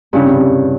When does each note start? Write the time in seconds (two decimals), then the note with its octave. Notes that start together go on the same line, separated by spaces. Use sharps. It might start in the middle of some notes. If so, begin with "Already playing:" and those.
0.13 G2 C#3 G3 C#4 E4
0.25 C3
0.36 C3